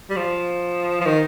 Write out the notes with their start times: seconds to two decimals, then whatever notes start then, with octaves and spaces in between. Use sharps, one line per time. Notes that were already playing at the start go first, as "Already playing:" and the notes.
0.10 G3
0.16 F3
1.01 F3
1.06 D#3